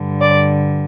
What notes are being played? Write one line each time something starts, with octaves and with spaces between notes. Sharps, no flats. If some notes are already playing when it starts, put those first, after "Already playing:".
Already playing: G2 D3
D5